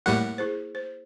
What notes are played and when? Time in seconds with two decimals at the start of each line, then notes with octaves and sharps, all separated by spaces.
0.06 A2 G3 A#3 E4 A#4 F#5
0.38 E4 G#4 C5
0.75 C5